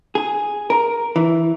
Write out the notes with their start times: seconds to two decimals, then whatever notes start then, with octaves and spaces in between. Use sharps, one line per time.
0.15 G#4
0.70 A#4
1.16 E3